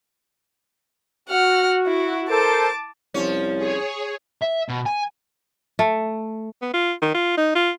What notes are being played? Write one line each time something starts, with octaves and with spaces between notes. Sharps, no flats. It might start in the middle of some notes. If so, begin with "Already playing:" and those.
F#4 F#5 F6
E4
A4 A#4 C5 A5 D6
C2 F3 C#4
G#4 C#5
E5
B2
G#5
A3
B3
F4
D#3
F4
D#4
F4